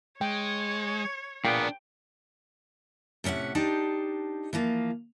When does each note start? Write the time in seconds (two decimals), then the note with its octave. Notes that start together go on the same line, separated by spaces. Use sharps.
0.21 G#3 C#5 G5
1.45 A#2 A#3 B3 D4 G#4 G5
3.24 A2 C3 C#4 E5 F#5
3.55 D4 D#4 G4 C5 A5
4.53 E3 F3 A#3 F4